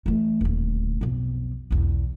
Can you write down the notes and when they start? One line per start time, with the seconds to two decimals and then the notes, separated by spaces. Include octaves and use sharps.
0.06 E3 A3
0.41 D#1 D2
1.01 B1 F2
1.71 B1 E2